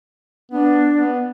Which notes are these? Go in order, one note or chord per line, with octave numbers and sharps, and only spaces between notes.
B3 D4
B3